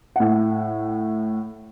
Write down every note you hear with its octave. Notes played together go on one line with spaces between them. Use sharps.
A2 F#5